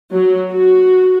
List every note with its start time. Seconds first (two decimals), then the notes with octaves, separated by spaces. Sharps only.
0.13 F#3
0.53 F#4